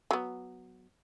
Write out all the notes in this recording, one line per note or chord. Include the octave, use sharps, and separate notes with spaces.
F#3 B3